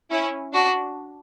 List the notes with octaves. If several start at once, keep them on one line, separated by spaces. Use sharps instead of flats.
C#4 E4
D4 F#4